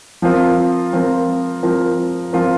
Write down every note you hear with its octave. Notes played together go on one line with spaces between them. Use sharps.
F3 C4 F4 A#4
F3 C4 F4 A#4
F3 C4 F4 A#4
F3 C4 F4 A#4